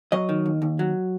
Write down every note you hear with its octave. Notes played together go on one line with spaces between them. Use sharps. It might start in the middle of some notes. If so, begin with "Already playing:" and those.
F#3 D#5
D#3
D#2
D#2
F#3